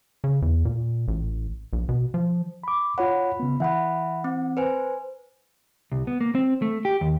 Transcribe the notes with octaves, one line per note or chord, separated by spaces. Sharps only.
C#3
E2
A#2
A1
A#1
B2
F3
B5 D6
F4 C#5 F#5 B5
C#3 B3
E3 E5 F#5 B5
C4
B4 C5 G#5
C2
B3
A#3
C4
A3
G4
D#2